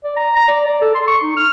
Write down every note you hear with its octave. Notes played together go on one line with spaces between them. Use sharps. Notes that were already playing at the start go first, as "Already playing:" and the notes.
D5
A#5
A#5
D5
D5
A4
C6
C#6
D#4
F6